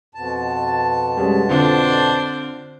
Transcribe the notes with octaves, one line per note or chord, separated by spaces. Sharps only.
F2 B2 A5
G3 G#3 C#4
D3 C4 D4 F4 C5